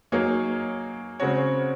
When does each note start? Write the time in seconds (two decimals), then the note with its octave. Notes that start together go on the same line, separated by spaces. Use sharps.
0.12 F#3 A#3 D#4 G#4 C#5
1.20 C#3 G#3 C4 F#4 C#5